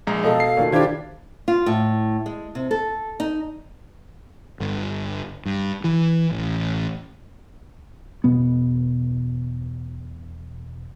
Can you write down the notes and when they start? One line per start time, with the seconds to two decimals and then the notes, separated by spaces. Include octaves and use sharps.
0.07 A#1 G#3 A#5
0.24 B2 A4 D#5 F5
0.40 C7
0.57 A#2 D#3
0.72 D#3 D4 E4 F4 G4 C5 G#6
1.48 F4
1.66 A2
2.26 G#3
2.55 C3
2.71 A4
3.20 D#4
4.60 G1
5.45 G2
5.84 E3
6.31 A1
8.24 E1 B2 B3